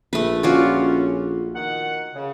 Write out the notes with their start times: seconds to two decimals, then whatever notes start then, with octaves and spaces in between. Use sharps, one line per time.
0.13 A#1 A3 B4
0.43 C#4 F4 F#4 D5
1.55 D#3 F#5
2.15 C#3